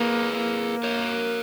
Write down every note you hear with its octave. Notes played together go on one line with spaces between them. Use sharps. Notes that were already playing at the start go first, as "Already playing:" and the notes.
Already playing: A#3 G#4 B4
A#3
A#4 C#5